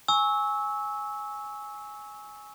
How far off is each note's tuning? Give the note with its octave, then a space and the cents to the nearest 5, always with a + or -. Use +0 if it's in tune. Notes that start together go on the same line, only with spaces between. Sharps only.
G#5 +0 C#6 +0 E6 -20